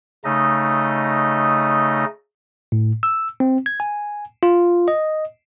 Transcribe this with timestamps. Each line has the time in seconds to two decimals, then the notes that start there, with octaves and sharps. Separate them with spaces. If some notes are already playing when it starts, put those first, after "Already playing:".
0.25 C#3 A3 D#4 D#5
2.72 A2
3.03 E6
3.40 C4
3.66 G#6
3.80 G#5
4.43 F4
4.88 D#5